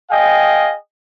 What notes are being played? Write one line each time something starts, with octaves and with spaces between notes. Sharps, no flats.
G#4 D#5 F5 G5 G#5